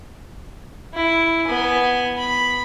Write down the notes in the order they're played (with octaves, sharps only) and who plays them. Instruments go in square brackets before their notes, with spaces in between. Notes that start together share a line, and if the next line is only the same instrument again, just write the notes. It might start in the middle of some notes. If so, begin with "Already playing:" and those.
[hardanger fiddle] E4
B3 G#5
B5